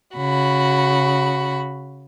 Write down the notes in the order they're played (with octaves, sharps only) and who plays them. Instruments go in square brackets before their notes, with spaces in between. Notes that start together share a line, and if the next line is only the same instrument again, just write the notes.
[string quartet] C#3 F#4 B5